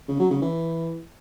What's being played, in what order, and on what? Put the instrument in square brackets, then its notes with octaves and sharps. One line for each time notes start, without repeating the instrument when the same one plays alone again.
[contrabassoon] C#3
F#3
C#3
E3